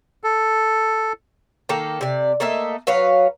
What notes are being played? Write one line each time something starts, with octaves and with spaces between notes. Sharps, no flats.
A4
D#3 A#3 A4
C3 D5
A3 A#3 D#5 E5
F#3 B4 C#5 F5